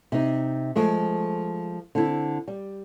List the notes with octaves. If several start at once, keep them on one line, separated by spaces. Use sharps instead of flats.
C3 D#4
F3 G#3 A3
D3 C4 E4
G3